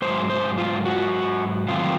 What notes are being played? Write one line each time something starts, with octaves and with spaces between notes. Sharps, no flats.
G#2 F#3 C5
C5
F4
F#4
F2 C3 D#3 F#3 F4